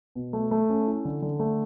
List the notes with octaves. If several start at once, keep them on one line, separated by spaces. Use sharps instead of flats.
B2
A3
A3
C#4
E4
D3
D3
A3